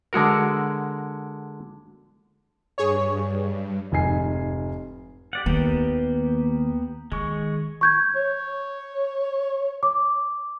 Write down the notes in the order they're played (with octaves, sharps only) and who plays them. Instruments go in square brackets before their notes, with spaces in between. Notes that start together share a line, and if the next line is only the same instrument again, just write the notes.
[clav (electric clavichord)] D3 G#3 F#4 A#4
[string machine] G2 [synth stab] G#4 C#5
[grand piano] F1 G#2 G#5 C7
[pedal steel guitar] G4 D5 F#5
[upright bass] D#2 [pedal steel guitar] A#3 B3 G4
[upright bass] D#3 [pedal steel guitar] G#3 C#6
[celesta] C#6 G6 G#6
[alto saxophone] C#5
[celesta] D6